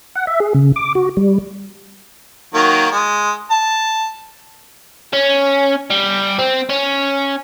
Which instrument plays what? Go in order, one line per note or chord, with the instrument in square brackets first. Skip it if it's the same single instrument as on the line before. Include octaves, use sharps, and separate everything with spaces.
[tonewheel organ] F#5
E5
G#4
C#3
D6
F#4
G3
[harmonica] D#3 F#3 A#3
G#3
A5
[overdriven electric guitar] C#4
G3
C4
C#4